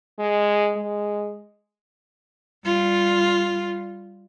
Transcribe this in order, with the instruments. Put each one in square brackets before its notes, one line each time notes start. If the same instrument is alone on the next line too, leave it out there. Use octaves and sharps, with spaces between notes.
[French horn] G#3
G#3
[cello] G3 F4